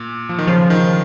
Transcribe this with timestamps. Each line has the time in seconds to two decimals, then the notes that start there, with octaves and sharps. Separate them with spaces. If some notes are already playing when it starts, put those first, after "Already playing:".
Already playing: A#2
0.29 F3
0.38 D#3
0.47 C#3 F3
0.70 D#3